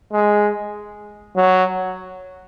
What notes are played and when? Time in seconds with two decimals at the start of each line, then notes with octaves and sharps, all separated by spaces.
0.13 G#3
1.36 F#3